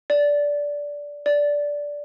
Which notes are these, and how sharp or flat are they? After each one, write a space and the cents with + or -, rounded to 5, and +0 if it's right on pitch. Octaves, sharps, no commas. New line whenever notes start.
D5 -15
D5 -10